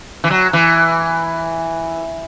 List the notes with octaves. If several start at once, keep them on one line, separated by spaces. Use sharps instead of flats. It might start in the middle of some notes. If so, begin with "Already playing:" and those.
E3
F#3
E3